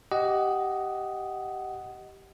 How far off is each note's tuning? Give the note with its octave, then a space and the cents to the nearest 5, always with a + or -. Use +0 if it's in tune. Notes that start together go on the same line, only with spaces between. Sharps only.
G4 -10 D#5 +0 F#5 +10